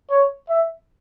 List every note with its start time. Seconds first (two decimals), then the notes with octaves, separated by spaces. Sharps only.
0.10 C#5
0.49 E5